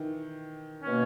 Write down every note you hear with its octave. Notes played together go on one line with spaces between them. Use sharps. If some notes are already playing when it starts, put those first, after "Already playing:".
Already playing: D#3 E3
B2 A#3 C#4